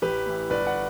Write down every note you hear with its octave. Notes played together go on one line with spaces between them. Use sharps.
A1 G4 B4
A2 E3
G1 B4 D5
D5 F#5